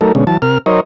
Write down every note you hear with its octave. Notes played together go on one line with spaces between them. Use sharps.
F#3 A3 D#4 A4 A#4
B2 D3 G#3 C#4
E3 F#3 A5
C3 A#4 F6
F#3 D#4 A#4 C5 C#5 D#5